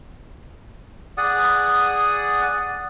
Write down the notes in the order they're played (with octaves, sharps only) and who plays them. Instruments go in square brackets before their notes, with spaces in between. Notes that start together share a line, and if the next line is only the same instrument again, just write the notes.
[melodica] G#4 D5 F#5 D#6